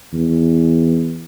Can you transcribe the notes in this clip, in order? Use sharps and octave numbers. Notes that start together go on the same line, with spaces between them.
E2